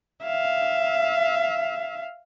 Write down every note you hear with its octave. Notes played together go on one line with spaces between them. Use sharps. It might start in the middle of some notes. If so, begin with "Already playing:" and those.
E5 F5